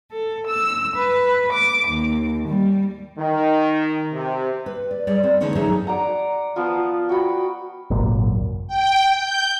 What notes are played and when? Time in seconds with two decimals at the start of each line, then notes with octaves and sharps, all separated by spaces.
0.11 A4
0.47 E6
0.96 B4
1.53 D6
1.88 D#2
2.48 G3
3.19 D#3
4.13 C3
4.66 B4
4.91 D5
5.07 G3 G#4 C#5 D5
5.23 C4
5.41 D3 E3 G#3 B3 C#4 D#4
5.55 F#3 D#4 G#4 A4 C#5 E5
5.87 D5 F#5 A#5
6.56 F3 B3 F4
7.09 F#4 G5 B5
7.90 G#1 C#2 F#2 A#2
8.67 G5
9.14 G6